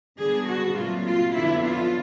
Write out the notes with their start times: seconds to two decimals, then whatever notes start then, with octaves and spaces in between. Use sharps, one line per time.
0.18 D3 G3 B3 D4 G#4
0.48 F#4
0.76 A#2 F#3 A3 C4 F4
1.06 F4
1.34 F2 D3 F#3 B3 D4 E4
1.64 F4